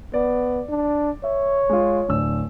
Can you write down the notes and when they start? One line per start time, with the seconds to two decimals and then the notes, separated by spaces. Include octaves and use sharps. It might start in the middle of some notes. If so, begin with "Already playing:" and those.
0.14 B3 D5
0.69 D4
1.24 C#5 E5
1.69 G#3 F4
2.09 D1 D4 E6